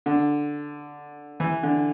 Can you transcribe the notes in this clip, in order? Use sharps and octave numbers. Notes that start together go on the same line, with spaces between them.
D3
E3
D3